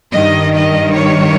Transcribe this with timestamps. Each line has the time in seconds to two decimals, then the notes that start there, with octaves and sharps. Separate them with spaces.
0.12 G2 D#3 G3 D#5
0.53 D#5
0.94 C#5